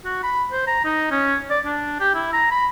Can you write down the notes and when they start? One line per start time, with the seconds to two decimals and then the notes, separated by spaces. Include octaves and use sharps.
0.05 F#4
0.23 B5
0.52 C5
0.67 A#5
0.85 D#4
1.11 C#4
1.50 D5
1.66 D4
2.00 G4
2.15 E4
2.33 A#5
2.51 B5